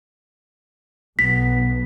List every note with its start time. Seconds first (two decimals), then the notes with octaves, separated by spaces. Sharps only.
1.19 B1 B3 B6